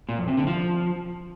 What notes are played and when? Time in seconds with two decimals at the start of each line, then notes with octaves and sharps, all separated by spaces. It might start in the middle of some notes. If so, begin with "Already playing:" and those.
0.09 A#2
0.18 F2
0.28 C3
0.37 D3
0.47 F3